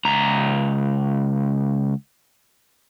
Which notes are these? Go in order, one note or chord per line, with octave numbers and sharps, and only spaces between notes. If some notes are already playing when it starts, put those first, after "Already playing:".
C#2 A#5